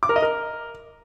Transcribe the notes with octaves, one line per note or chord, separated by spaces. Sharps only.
D6
A#4
D#5
A#4